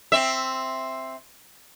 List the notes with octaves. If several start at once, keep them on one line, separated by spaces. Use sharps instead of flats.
C4 E5